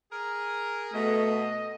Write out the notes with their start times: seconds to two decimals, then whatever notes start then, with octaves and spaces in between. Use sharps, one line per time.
0.12 G#4 A#4
0.94 B2 A3 D#5